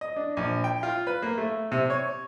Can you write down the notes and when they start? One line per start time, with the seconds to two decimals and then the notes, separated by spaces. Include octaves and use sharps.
0.01 D#5
0.16 D4
0.37 A#1
0.64 G5
0.83 F4
1.07 B4
1.22 A#3
1.38 A3
1.72 C3
1.90 C#5